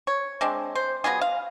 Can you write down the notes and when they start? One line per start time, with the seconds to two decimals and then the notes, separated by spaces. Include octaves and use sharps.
0.07 C#5
0.41 G#3 C4 D4
0.75 C5
1.04 F#3 B3 F4 G#4
1.21 F5